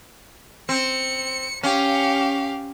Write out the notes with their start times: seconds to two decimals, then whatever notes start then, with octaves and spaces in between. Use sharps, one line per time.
0.69 C4 C#7
1.63 C#4 G4 F5